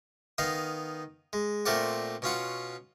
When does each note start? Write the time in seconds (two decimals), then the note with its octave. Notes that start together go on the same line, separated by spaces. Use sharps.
0.38 D#3 B3 D#4 F5
1.33 G#3
1.65 A#2 A3 C4 A#4 D5 F#5
2.22 B2 C#4 F4 F#5